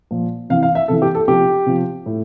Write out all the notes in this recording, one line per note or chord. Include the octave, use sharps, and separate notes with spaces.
A#2 F3
C3 E3 F5
F5
E5
C3 E3 A4
G4
A4
C3 F3 G4
C3 F3
A2